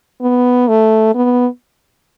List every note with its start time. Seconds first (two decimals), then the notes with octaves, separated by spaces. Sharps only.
0.22 B3
0.68 A3
1.15 B3